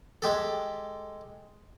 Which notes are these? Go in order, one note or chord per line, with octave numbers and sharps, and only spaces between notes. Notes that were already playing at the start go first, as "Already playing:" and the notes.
G#3 G4 A4